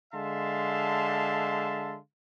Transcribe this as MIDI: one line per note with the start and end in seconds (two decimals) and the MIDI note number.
0.14 1.98 50
0.14 1.98 56
0.14 1.98 76
0.14 1.98 77
0.14 1.98 81
0.14 1.98 84